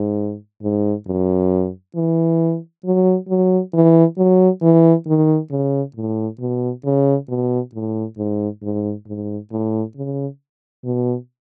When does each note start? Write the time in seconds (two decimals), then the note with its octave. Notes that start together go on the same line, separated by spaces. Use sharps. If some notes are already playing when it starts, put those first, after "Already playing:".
Already playing: G#2
0.62 G#2
1.07 F#2
1.95 E3
2.85 F#3
3.29 F#3
3.73 E3
4.18 F#3
4.62 E3
5.07 D#3
5.51 C#3
5.96 A2
6.39 B2
6.84 C#3
7.28 B2
7.73 A2
8.17 G#2
8.62 G#2
9.06 G#2
9.51 A2
9.96 C#3
10.84 B2